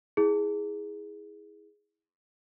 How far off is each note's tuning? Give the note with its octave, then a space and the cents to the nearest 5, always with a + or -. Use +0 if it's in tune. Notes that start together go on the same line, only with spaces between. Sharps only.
E4 -25 G#4 +0